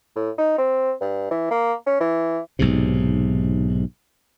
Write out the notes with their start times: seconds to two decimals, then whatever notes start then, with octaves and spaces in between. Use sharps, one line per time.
0.16 A2
0.38 D#4
0.58 C4
1.01 G2
1.31 E3
1.51 A#3
1.86 C#4
2.01 E3
2.59 B1 G#2 C3